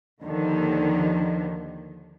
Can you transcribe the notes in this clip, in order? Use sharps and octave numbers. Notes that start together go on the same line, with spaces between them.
D#2 D3 D#3 F3